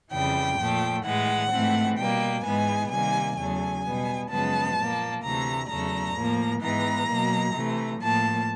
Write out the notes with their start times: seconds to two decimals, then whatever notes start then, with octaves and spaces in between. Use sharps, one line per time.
0.11 F2 C#3 E3 G3 G5
0.59 A#2 F3 A3
1.04 A2 E3 G#3 F#5
1.51 G#2 E3 A3 C4
1.97 B2 G3 A#3 G5
2.43 G#2 E3 G#3 B3 G#5
2.90 C3 D#3 G3 A#3 G#5
3.36 E2 C#3 F#3 A3 G#5
3.83 B2 G3 B3
4.29 F#2 C#3 F3 G#3 B3 A5
4.77 A#2 F3 A#3
5.22 D2 C3 E3 A3 A#5
5.68 E2 C#3 F#3 A3 A#5
6.15 A2 F3 A#3
6.61 G#2 E3 G#3 B3 A#5
7.08 B2 F#3 A#3
7.54 C3 E3 A3
8.01 A2 F3 A#3 A5